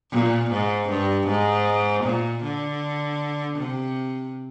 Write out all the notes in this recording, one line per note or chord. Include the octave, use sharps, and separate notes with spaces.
A#2
G#2
G2
G#2
A#2
D3
C3